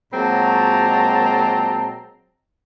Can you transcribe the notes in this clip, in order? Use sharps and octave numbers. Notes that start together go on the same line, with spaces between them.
A#2 F#3 G#3 C4 A5 A#5